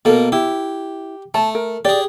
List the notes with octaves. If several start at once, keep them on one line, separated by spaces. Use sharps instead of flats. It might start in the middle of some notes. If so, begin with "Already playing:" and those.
B2 A#3 A4 A#4
E4 G4
A3 A5
A#4
G4 G#4 D5